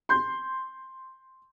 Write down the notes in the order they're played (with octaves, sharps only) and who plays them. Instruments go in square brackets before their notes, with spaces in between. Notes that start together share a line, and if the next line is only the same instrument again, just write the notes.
[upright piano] C6 G6